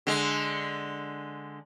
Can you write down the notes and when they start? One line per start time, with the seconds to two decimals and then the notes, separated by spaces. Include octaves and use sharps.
0.07 D3 G#3